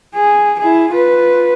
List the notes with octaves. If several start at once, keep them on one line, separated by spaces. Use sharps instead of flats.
G#4
E4 G#4
F4 B4